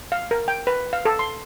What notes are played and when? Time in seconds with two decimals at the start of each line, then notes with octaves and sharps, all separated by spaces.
0.12 F5
0.31 A#4
0.48 G5
0.67 B4
0.93 F5
1.05 A4
1.19 C6